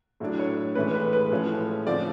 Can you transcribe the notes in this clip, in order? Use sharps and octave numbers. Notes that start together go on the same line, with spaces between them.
A2 F#3 A3 D4
C#5
A2 E3 G#3 C#4 B4
B4
B4
A2 F3 G#3 C#4
D3 F3 A3 C4 D5